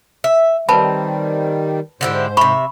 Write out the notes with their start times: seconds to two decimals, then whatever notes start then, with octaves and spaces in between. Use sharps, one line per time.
0.24 E5
0.69 D#3 G3 C4 B4 A5 B5
2.01 G#2 D3 E4 G4 C5
2.37 C3 E5 B5 C#6